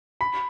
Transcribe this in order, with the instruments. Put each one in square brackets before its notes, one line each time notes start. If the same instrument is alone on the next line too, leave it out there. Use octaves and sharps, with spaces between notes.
[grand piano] B5